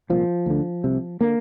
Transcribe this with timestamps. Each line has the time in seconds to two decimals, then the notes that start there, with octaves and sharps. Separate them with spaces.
0.10 C2 A#2 F3
0.46 D2 D3
0.84 C2 C3
1.21 D3 A#3